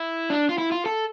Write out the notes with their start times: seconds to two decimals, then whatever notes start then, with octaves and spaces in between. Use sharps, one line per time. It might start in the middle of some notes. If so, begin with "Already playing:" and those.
Already playing: E4
0.30 D4
0.49 F4
0.58 E4
0.72 F4
0.86 A4